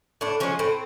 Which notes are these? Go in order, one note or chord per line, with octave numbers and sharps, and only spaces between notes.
A2 D4
F3 G#3 C#4
A2 C4